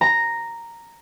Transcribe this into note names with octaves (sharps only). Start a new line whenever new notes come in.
A#5